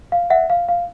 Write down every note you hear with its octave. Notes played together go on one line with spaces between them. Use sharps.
F5
E5 F#5
F5
F5